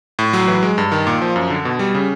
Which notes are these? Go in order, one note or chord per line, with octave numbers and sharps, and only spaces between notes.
A2
F#3
E3
G#3
G2
D#3
A#2
F3
F#2
D3
B2
G3
C#3